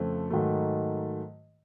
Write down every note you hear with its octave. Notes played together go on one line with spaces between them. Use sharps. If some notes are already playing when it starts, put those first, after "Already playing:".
Already playing: F2 C#3 F3 A3 C4
G#2 D#3 F#3 A3